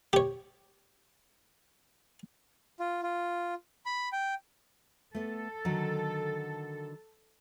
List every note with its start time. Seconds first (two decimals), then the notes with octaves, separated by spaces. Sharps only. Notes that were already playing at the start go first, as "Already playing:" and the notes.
0.13 G4 C#5
2.80 F4
3.03 F4
3.86 B5
4.12 G5
5.14 A3 B3 A4
5.65 D3 D#3 F#3